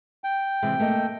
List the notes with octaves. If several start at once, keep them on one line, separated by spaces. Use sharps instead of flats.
G5
C3 E3 G#3
A3 A#3 D#5